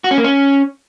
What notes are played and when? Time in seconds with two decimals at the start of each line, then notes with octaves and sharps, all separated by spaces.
0.04 F#4
0.11 C#4
0.18 A#3
0.24 C#4